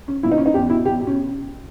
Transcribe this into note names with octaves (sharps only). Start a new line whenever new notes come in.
C#4
A#2 E4
D#4
C#4
D#4
E2 G4
B2 E4
E2 G4
B2
C#4